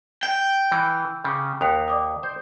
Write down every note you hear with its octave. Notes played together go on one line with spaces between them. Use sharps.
G5
E3
C#3 D6 G6
D#2 D#6 F#6 F7
D5 D6 D#6
C5